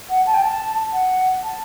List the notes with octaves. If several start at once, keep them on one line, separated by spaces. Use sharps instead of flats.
F#5
A5
G5
A5
F#5
A5